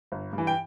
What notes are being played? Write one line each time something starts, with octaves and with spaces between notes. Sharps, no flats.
G1
G2
E3
G5